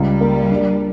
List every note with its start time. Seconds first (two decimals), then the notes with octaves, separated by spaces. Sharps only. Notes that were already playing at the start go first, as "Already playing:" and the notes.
Already playing: C#2 G3
0.21 A#3
0.50 D4